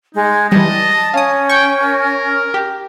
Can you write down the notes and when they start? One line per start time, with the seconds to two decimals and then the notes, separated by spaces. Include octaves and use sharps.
0.15 G#3 D#4
0.52 E3 G3 D#5 A5
1.14 C#4 F5 D#6
1.49 G5 C#6
1.80 A#4
2.54 G4